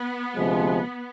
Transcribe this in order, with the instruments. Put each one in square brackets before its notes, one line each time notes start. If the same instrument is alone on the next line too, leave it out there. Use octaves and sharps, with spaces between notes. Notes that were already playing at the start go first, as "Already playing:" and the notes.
Already playing: [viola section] B3
[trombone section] D2 C3 F3 G#3